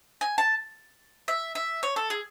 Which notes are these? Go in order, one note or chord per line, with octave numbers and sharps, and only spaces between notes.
G#5
A5
E5
E5
C#5
A4
G#4